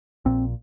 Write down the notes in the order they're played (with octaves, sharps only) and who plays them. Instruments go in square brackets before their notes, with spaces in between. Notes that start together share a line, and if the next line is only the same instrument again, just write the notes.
[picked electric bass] A#1 A#2 C4